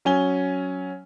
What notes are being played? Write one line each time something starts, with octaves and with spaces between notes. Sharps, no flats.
F#3 C#4 G#5 G7